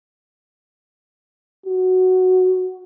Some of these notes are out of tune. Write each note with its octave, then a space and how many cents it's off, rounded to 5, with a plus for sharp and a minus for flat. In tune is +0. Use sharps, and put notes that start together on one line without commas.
F#4 +0